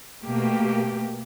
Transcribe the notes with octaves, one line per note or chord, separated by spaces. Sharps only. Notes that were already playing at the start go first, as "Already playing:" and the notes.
B2 A3 A#3 G4